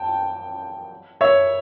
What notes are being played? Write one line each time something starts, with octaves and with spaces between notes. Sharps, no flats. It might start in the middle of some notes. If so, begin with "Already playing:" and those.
Already playing: G5 A5
C#5 E5